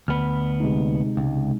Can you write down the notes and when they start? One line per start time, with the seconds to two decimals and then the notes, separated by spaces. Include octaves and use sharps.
0.08 D2 B3 B5 F6
0.60 C3 G#3 D#4
1.17 C#2